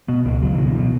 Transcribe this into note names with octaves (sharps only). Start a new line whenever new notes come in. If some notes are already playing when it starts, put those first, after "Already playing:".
B2 B3
C#2 A#3
C#2 F#3
E3
B2
E3
B2 F#3